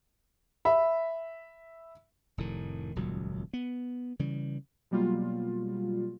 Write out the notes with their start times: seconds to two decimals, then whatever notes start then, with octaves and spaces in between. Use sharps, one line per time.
0.65 E5 B5
2.38 F1 A2 D#3
2.96 D#1 C#2 A#2 F#3
3.53 B3
4.19 C#3 E3 G3
4.91 B2 F#3 G3 A#3 F4